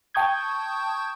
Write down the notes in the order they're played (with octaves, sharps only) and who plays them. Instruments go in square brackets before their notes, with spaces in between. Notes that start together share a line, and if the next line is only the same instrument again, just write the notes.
[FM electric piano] G5 A5 C#6 D#6 G6 G#6